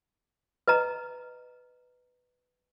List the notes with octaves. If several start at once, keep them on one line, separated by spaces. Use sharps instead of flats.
B4 D#5 A#5